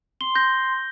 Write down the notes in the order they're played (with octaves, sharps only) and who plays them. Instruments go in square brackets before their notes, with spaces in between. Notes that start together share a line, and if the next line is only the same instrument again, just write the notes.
[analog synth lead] C6 [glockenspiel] G7
[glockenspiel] G6 A#6